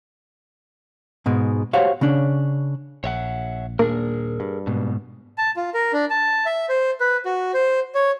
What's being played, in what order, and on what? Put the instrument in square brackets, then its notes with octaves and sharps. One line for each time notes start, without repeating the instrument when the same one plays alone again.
[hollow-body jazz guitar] G#2 B2 G#3
F#4 G4 C5 C#5 F5 F#5
C#3 C#4 D4
[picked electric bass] A#1 [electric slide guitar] C#5 E5 F#5
[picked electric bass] D#1 A#2 D4 [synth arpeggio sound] A#3 [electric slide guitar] G#4 A#4
[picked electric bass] G2
[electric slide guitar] G#2 B2
[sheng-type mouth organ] A5
F4
A#4
D4
A5
E5
C5
B4
F#4
C5
C#5